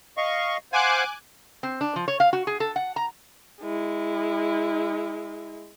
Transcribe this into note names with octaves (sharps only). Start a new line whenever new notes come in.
D#5 F5 C#6
C5 F5 F#5 G#5 D6 F#6
C4
D4
F3
C#5
F5
F#4
G#4
A4
F#5
A#5
G#3 E4